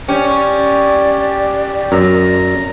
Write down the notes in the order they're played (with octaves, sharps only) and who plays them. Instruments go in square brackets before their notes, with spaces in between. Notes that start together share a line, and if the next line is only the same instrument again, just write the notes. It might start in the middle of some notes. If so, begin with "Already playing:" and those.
[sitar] C#4 [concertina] G4 [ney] D5
[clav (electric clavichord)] F#2 [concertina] A#5